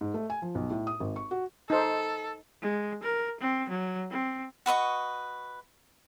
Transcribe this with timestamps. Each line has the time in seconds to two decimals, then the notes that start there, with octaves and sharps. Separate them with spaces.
0.01 G#2
0.14 A3
0.30 G#5
0.42 F3
0.55 B1
0.70 A2
0.87 D#6
1.00 G#1
1.16 C#6
1.31 F#4
1.70 D#4 A4 C5
2.62 G#3
3.03 A#4
3.41 C4
3.70 F#3
4.11 C4
4.66 F#4 B4 D#5 C#6